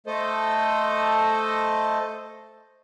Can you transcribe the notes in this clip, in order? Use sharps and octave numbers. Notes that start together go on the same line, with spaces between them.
A3 A4 C5 D#5